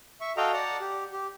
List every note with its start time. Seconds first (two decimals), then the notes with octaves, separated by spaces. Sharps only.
0.21 E5 C#6
0.37 F#4 A4 D#5 F5 G5 A#5
0.53 D5 F#5 A5 A#5
0.81 G4
1.12 G4